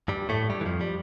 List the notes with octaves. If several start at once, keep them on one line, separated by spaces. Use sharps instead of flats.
G2 G3
A2 A3
G2 G3
E3
F2 F3
G3